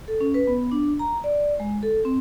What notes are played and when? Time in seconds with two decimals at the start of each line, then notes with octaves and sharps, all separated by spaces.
0.08 A4
0.21 C#4
0.34 B4
0.47 B3
0.72 D4
0.99 A#5
1.24 D5
1.60 G#3
1.83 A4
2.05 C4